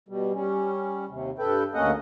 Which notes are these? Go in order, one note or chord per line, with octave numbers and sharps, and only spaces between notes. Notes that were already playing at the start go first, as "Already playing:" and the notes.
B2 G3
G3 C#4
D#2 C3
G2 A4 B4 G5
D2 A#3 C#4 D#5 F#5